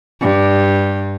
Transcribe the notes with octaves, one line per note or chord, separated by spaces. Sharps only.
G2